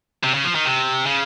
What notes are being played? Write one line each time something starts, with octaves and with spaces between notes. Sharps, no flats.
C3
C#3
F3
D#3
C3
C#3